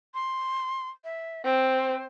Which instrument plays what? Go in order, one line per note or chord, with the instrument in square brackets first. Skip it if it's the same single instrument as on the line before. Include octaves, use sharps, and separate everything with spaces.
[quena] C6
E5
[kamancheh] C4 [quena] C5